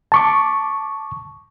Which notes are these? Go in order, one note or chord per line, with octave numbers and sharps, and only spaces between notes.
A5 C#6 D6